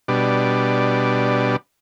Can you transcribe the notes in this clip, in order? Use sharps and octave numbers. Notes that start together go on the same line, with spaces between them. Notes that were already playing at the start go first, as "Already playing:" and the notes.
B2 G3 D4